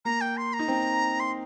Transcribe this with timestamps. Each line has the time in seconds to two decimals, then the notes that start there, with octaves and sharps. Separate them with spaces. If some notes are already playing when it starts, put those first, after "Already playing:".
0.05 A#3 A#5
0.21 G5
0.37 C6
0.53 A#5
0.59 D#4
0.68 C4
1.20 C6